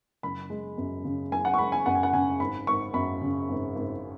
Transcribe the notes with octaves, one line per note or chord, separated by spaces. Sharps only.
F#1 B5
G#3
F#2
C#3
F#1 G#5
F#5
C#6
G#3 B5
G#5
F#2 F#5
G#5
F#5
C#3 G#5
G#1 B5
G#1 C#6
F#2 B5
C#3
G#1
G#1